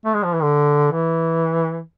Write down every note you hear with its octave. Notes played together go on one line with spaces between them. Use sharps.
A3
G#3
F3
E3
D3
E3